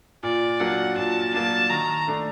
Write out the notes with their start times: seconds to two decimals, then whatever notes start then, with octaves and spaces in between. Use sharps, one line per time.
0.23 A#2 D5
0.60 F#3 A#3 D4 F#5
0.97 A#2 A5
1.34 F#3 A#3 D4 A5
1.70 D#3 A#5
2.07 A3 D4